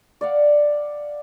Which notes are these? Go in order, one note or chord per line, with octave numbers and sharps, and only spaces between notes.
D5 F5 F#5